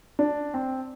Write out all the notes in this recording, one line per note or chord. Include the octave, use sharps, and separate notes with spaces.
D4
C4